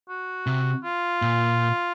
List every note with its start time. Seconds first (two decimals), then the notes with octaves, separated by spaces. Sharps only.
0.09 F#4
0.46 C3
0.84 F4
1.22 A#2